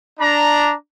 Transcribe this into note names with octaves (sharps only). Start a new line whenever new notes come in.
D4 A#5